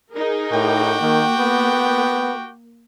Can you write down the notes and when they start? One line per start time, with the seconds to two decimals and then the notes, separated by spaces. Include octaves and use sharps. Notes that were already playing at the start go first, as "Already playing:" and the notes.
0.12 D#4 G#4 A#4
0.52 A2 F#4 G4 G5
1.02 D#3 A#3
1.39 B3